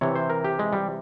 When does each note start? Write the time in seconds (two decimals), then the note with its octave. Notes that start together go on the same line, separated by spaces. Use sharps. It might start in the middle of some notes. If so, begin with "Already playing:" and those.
0.01 C3 E3 C#5
0.15 C5
0.30 A#4
0.44 G4
0.59 G#3
0.73 G3